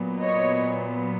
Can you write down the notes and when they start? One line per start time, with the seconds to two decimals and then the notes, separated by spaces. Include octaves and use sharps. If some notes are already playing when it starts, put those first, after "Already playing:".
Already playing: A#2 F#3 B3
0.20 C#5 D#5